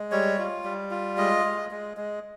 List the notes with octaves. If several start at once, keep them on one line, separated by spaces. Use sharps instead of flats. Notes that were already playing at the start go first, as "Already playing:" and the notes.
Already playing: G#3
G3 C#5
F4
G3
F4
G#3 D#5
G#3
G#3
G#3